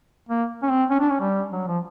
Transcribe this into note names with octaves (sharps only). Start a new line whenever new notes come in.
A#3
C#4
C4
C#4
D4
C#4
G3
F#3
F3